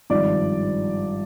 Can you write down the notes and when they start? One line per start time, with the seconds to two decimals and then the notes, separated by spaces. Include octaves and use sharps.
0.10 G#1 G2 F3 D5 D6